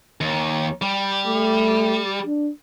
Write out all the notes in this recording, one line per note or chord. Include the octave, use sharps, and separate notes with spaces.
D#2
G3
A3
D4